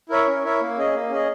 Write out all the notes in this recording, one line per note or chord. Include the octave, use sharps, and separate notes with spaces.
E4 A#4 C#5 E5
C#4
E4 A#4 C#5 E5
A#3
C#4 G#4 D#5
A#3
C#4 G#4 D#5